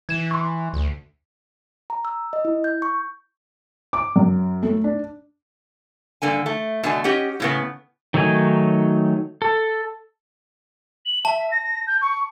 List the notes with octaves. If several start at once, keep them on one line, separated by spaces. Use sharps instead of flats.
E3 G#6 E7
C6 C#6
D2
A#5
E6
D#5
E4
G6
C#6
D6
F#2
A3
D4
G2 D3 A#3 G#5
A3
B2 D3 A3 D4 G#5
C#4 G4 D#5 F#5
A2 C#3 B3
D#3 F#3 A3 D#4 G#5
A4
F#7
E5 A5
A#6
G6
C#6